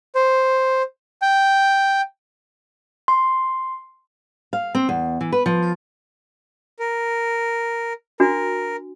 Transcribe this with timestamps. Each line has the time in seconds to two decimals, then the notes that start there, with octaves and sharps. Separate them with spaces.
0.15 C5
1.22 G5
3.08 C6
4.53 F5
4.75 C4
4.89 E2
5.21 E3
5.32 B4
5.46 F3
6.79 A#4
8.20 D4 F#4 A#4